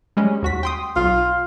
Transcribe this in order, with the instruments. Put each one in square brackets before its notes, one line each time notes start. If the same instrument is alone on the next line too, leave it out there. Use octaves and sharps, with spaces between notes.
[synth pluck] G3 G#3 C#4
D#2 F#4 B6
G5 C6 D#6
[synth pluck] B1 [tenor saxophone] F4